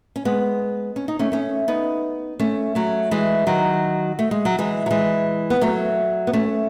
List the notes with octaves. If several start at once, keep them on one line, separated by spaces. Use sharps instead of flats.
C#4
G#3 B3
C#4
D#4
A3 C#4
A3 C#4
B3 D#4
A3 C#4
F#3 A3
E3 G#3
D#3 F#3
A3
G#3
F#3
E3 G#3
F#3
E3 G#3
B3
F#3 A3
B3
A3 C#4